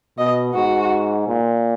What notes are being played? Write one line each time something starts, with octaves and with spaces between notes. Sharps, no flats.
B2 D#5
G#2 F#4
A#2